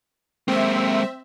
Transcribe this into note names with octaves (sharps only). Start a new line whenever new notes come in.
G#3 A#3 C4 E5